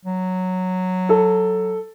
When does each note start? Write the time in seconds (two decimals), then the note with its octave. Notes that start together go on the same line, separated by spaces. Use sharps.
0.05 F#3
1.09 A4